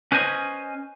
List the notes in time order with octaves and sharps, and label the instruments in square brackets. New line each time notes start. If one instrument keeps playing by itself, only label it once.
[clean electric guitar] C#4 B4 C5 D#5 G#5